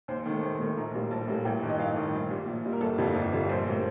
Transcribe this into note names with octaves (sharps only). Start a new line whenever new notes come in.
D#2 C5
D#3 A3
D#2
D#3 A3
A#1 A#5
A2 G3 A#3
A#1 A5
A2 G3 A#3
A1 G5
G2 D#3
D#5
A1 F5
G2 D#3
A#1
A#2 G3
A#1
A#2 G3
A#4
G1 A4
F2 D3 G3 A#3
G1 A4
F2 D3 G3 A#3
A#1 C5
A2 G3 A#3